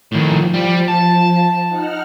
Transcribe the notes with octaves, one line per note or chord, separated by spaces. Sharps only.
A2 D#3 F3
G3
A5
D#4 F#5 F6